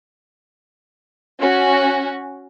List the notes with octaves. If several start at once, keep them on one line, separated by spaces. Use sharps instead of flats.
C#4 F#4